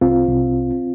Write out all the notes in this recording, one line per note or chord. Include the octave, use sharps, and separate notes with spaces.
C2 C4 F4
C2